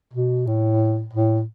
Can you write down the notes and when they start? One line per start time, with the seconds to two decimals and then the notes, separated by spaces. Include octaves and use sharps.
0.14 B2
0.47 A2
1.13 A2